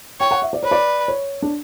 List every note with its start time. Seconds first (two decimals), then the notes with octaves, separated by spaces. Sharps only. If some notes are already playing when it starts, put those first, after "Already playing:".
0.20 C#5 G5
0.31 F#5
0.42 E5
0.53 D5
0.63 B4 C#5
0.71 D5
1.08 C#5
1.42 D4